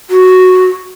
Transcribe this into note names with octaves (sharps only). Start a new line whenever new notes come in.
F#4